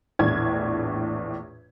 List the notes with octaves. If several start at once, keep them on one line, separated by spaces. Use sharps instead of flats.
A#1 E2 A2 G#6